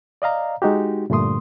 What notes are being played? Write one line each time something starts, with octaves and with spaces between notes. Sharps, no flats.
D5 D#5 F5 A#5
G#3 D#4 F#4 G4
G2 A#2 D3 A3 C6 D#6